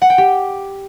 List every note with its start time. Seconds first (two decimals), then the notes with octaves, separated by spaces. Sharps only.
0.02 F#5
0.10 G5
0.18 G4